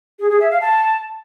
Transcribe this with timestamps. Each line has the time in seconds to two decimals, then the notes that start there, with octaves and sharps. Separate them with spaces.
0.19 G#4
0.30 G#4
0.40 E5
0.51 F5
0.61 A5